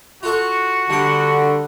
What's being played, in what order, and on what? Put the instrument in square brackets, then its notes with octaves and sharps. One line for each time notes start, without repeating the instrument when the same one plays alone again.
[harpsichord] F4 A4 C#6 [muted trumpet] F#4
[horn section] D3 [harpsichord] G3 D#6